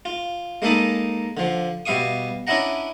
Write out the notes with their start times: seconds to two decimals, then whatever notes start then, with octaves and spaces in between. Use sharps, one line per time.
0.05 F4
0.62 G#3 A#3 D#4 A4 B5 D#6
1.37 D3 F3
1.86 B2 G3 E5 F5 C#6 D#6
2.47 C#4 D4 E4 D#5 F#5 A#5